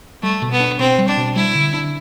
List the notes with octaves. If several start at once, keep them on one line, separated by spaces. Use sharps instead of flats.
G3 A3
B2
B3
D4
B2 C4
G3
D4
B2
G3 E4
D3
D4